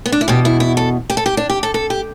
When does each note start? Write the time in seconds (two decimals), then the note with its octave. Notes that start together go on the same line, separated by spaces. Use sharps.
0.06 B3
0.12 D4
0.21 E4
0.28 E2 B2 G4
0.45 E4
0.60 E4
0.77 A4
1.10 G4
1.17 A4
1.26 G4
1.37 D4
1.49 G4
1.63 A4
1.74 A4
1.90 G4